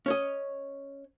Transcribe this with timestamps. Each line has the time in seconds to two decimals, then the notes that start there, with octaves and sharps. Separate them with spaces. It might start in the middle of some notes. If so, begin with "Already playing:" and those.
0.06 C#4 C#5 D#5